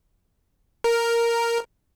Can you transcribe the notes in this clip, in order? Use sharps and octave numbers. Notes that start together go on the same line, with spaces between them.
A#4